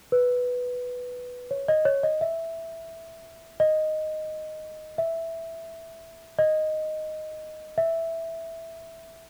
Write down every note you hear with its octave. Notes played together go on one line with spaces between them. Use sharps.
B4
C#5
D#5
C#5
D#5
E5
D#5
E5
D#5
E5